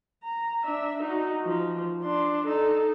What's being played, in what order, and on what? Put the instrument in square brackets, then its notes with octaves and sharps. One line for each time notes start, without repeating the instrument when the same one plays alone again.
[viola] A#5
D4 E5
D#4 F#4
F3
D4 C6
D#4 A4